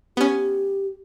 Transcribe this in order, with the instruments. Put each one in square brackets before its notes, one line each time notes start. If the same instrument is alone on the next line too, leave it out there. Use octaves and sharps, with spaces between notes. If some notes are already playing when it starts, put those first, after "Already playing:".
[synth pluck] B3 C#4 [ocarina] G4